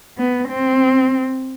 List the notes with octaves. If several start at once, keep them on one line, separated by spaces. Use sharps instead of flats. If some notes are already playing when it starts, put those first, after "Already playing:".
B3
C4